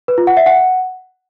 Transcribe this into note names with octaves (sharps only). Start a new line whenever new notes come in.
B4
F4
F#5
E5
F#5